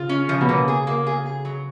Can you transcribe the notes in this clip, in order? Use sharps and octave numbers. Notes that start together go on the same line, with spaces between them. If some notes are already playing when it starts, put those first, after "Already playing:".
Already playing: C#3 F4
C#4
C#3 F3
B2
C#3 A#3
G#4
A#3
G#4
G#4
F#3